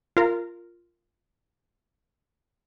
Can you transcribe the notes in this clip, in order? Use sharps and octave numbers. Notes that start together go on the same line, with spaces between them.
F4 A#4